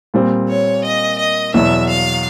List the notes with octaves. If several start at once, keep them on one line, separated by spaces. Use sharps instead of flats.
A#2 G3 C4
C#5
D#5
D#5
E2 B2 F#3 E5
F5